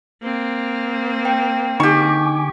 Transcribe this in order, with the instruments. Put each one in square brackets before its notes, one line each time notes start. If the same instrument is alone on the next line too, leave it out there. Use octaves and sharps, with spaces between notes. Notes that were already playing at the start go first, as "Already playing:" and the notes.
[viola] A#3 C4
[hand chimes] G5
[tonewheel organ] D3 G#5 D6 [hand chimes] D#4 [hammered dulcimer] G4 C#6